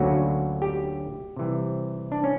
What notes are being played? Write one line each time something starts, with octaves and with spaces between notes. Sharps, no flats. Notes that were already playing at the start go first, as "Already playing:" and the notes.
Already playing: D2 D3 F#3 A#3 C#4 F#4
G4
C3 E3 G3
D4
C#4